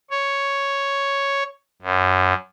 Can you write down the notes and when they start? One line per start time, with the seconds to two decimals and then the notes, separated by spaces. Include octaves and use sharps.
0.10 C#5
1.82 F#2